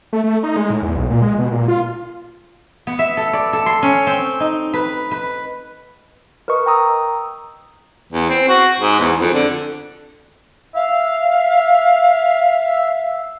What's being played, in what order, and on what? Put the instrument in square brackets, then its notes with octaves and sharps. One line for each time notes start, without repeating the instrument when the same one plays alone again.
[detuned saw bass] A3
A3
D#4
G#3
A2
E2
B1
A#2
G#3
B2
A#2
F4
[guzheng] B3
E5
A4
D5
A4
C6
C#4
C4
D#4
B4
B4
[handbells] A#4 B4 D#5 C#6 D#6
G5 A#5 D#6 E6
[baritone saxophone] E2
C4
F#4
G#2
E2
F2
D3
[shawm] E5 [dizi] F5